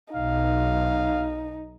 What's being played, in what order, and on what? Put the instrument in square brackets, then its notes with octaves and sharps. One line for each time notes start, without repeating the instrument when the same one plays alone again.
[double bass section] B1 [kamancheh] D#4 [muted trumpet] F5